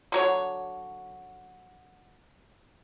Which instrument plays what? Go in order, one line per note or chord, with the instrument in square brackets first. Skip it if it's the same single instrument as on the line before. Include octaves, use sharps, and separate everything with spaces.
[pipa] D3 F#3 C#5